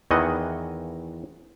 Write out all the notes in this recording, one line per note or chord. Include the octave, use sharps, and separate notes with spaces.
E2 D#3 E3 D#5 F#5